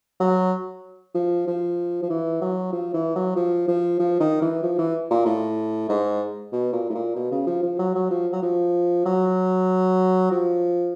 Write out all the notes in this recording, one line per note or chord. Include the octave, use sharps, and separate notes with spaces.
F#3
F3
F3
F3
E3
F#3
F3
E3
F#3
F3
F3
F3
D#3
E3
F3
E3
A#2
A2
G#2
B2
A#2
A2
A#2
B2
C#3
F3
F3
F#3
F#3
F3
F#3
F3
F#3
F3